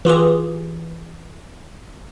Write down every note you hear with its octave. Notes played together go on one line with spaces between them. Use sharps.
E3 F4 G4 G#4